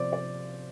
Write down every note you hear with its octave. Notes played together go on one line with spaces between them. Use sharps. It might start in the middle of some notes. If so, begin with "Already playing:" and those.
Already playing: C3 F3 C5 D5
D5